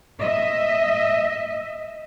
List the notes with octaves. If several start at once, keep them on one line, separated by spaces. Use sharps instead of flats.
D#5 E5